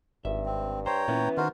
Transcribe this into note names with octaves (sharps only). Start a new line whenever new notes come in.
G#1 G2 E5
C4
C5 C#5 G5 A#5
A#2 E3 B3 C#4
D#3 F#4 A#4 C5